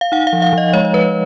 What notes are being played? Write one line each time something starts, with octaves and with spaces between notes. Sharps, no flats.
F5
D#4 F#5
F5
F3
F5
F3 D#5
G#3 C#5
C#5
G#3 B4